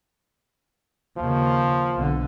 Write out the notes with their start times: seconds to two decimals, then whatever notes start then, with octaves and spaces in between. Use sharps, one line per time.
1.17 D#2 C#3 F3
1.96 B1 D3